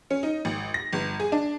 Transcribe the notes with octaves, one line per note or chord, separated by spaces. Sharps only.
C#4
D#4
G#1
A#6
G1
G#4
D4